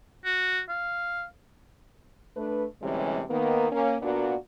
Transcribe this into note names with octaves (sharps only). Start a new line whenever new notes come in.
F#4
F5
A3 D4 B4
D2 C3 E3 G3 G#3 C#4
D#3 A#3 B3
A#3 C#4
A#2 A#3 B3 D4 F#4 D5